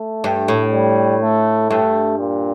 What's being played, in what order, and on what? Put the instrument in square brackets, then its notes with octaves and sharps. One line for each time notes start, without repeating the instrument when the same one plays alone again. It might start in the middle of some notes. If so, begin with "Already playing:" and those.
Already playing: [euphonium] A3
[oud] G2
A2
[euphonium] G3
A3
[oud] G2 [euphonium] A3
[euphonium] A#2